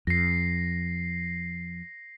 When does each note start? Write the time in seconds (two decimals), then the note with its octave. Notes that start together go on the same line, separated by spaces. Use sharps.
0.07 F2 A#6 C7